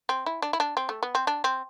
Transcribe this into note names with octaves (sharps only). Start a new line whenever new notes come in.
C4
E4
D4
E4
D4
C4
A3
B3
C4
D4
C4